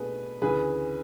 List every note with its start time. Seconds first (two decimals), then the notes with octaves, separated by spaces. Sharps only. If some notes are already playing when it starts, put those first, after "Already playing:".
Already playing: B2 A3 D4 G#4 B4
0.42 D2 C#3 E3 G#4 B4